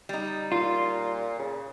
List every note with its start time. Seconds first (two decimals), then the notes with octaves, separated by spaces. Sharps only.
0.09 G3 D#4
0.52 A#2 F4
1.39 C#3